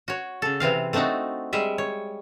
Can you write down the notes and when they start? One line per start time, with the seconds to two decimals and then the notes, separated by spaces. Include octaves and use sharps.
0.08 F#4 C#5
0.42 C#3 A4
0.60 C3 E3 C4 F5
0.93 A3 C4 D4 D#4 F#4
1.53 G3 G#3 E5
1.78 C#5